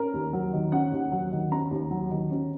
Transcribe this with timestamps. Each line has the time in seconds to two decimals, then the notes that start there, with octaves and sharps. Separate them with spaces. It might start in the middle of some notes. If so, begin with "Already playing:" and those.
Already playing: C#4 A#4
0.13 D#2
0.33 F#3
0.53 D#3
0.72 C#4 F#5
0.92 D#2
1.12 F#3
1.32 D#3
1.51 C#4 A#5
1.71 D#2
1.91 F#3
2.11 D#3
2.31 C#4